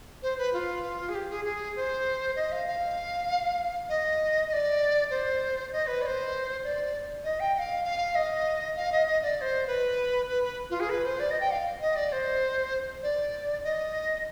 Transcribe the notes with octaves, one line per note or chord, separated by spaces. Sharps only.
C5
B4
F4
G#4
G4
G#4
G#4
C5
D#5
F5
F5
D#5
D#5
D5
C5
D#5
B4
D5
C5
D5
D#5
G5
G5
F5
F5
D#5
F5
D#5
D#5
D5
D5
C5
B4
B4
B4
F4
G#4
B4
C5
D5
D#5
G5
F5
D#5
D5
C5
D5
D#5